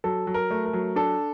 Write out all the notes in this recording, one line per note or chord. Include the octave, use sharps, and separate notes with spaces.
F#3 A4
F#3
A#4
A3
A#4
F#3
D4 A4